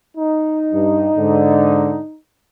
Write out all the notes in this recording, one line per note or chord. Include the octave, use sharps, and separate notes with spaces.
D#4
G2
G#2 D3